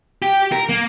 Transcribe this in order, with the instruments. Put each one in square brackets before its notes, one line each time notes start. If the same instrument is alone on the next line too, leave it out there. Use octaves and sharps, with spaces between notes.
[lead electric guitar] G4
A#4
A#3